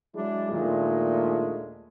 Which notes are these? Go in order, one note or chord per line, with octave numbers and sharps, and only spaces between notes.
F#3 G#3 D4 E4
D#2 A#2 G#3 A3 D4